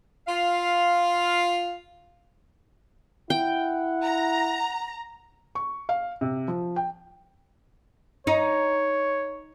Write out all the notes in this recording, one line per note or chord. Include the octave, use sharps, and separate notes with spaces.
F4 F5
E4 F#5 G5
A#5
C#6
F5
C3
F3
G5
D#4 C#5